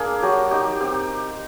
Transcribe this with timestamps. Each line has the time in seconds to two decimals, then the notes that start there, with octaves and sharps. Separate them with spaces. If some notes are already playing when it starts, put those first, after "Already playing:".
Already playing: A#3 D4 G#4
0.22 F#3 G4
0.51 D#4 G4
0.80 C4 G4